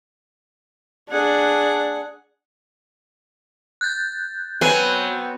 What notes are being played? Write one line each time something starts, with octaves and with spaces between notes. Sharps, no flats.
D4 G#4 F#5
F#6 G6 A6
F#3 B3 C4 B4 G#5